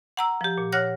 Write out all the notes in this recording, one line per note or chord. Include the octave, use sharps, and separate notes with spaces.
F#5 A#5 E6
F3 G4
A#2
C#5 F#5 F6 F#6 A#6